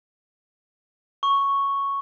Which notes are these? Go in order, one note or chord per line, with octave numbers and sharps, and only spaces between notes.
C#6